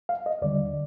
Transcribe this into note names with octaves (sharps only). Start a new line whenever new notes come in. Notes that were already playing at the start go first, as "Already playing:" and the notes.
F5
D#5
D#2 D3 G3 D5